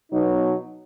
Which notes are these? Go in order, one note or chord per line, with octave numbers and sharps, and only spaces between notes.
B2 F#3 B3 D#4